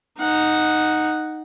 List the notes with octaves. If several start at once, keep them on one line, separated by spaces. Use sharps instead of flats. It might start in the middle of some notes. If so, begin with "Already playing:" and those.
D#4 F#5